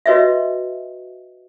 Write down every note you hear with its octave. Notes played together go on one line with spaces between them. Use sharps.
F#4 B4 C#5 D#5 E5